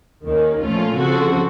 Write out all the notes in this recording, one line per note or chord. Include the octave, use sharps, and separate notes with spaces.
D#2 D#3 A#3 C#4
A#2 F3 A3 C#4 F4
C#3 F3 C4 F#4 A4